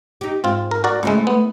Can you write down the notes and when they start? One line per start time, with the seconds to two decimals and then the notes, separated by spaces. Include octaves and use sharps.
0.21 D#4 G4
0.44 G#2 C4 F4
0.71 A#4
0.84 F#4 A#4 D5
1.03 C#2 G#3 A3 C4 E4
1.27 B3